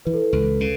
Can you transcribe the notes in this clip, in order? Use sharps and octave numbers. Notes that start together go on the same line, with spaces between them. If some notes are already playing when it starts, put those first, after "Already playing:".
E3 B4
A4
B4
C#2
C#3